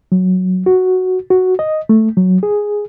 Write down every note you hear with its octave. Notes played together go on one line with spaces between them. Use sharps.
F#3
F#4
F#4
D#5
A3
F#3
G#4